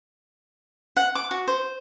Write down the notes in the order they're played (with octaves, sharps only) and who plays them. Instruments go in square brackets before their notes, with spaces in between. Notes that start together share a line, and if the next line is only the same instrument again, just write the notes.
[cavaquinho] F#5
D6
F#4
C5